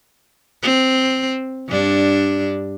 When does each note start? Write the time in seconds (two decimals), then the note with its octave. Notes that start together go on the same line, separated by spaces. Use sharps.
0.63 C4
1.69 G2 D4